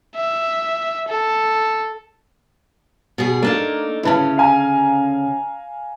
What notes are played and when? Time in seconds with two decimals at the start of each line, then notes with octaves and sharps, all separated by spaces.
0.16 E5
1.08 A4
3.18 B2 G3 G#4
3.42 A3 A#3 D4 D#4
4.03 D2 C#3 C#4 E4 B4 A5
4.38 F5 G#5 A#5